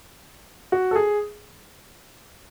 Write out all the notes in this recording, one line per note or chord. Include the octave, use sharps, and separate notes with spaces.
F#4
A4
G#4